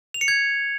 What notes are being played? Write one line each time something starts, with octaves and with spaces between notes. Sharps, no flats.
F7
C#7
G#6